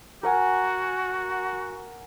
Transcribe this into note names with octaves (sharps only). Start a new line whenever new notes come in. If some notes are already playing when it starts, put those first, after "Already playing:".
F#4 A#4 F#5 G#5